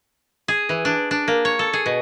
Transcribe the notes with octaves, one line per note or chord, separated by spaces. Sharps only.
G#4
E3
D4
D4
A#3
C#5
A4
G#4
B2